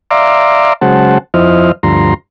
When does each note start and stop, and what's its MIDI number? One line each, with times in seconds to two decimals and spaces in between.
0.11 0.73 74
0.11 0.73 76
0.11 0.73 77
0.11 0.73 82
0.11 0.73 84
0.11 0.73 86
0.81 1.18 49
0.81 1.18 54
0.81 1.18 56
0.81 1.18 72
0.81 1.18 78
0.81 1.18 81
1.34 1.72 41
1.34 1.72 53
1.34 1.72 64
1.34 1.72 72
1.34 1.72 75
1.34 1.72 89
1.83 2.14 38
1.83 2.14 43
1.83 2.14 53
1.83 2.14 82
1.83 2.14 84